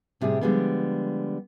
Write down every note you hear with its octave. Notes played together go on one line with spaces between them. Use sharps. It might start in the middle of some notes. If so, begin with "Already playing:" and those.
A2 C3 G3 C4 G#4
D3 F3 G3 G#3 A#3 B3